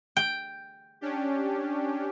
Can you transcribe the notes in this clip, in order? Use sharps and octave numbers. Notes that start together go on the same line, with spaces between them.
G5
C#4 D4 G4